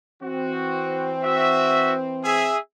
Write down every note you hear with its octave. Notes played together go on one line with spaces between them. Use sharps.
E3 C4 F#4
F#4 E5
G#4 E5